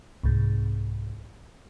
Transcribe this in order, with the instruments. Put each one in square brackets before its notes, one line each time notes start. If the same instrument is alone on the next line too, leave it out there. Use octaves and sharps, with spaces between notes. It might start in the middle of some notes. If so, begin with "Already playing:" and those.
[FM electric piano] C2 G#2